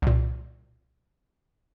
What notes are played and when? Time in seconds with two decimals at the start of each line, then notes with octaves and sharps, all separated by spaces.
0.02 C2 A#2